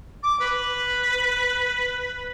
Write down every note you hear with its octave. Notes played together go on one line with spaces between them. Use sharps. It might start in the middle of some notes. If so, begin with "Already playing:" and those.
D6
B4